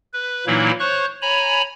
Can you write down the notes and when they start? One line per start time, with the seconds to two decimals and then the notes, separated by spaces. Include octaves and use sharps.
0.13 B4
0.47 A#2 E3 F#3 A#3 D#4 E4
0.80 C5 C#5 C#6 F#6
1.22 C#5 G#5 A#5 B5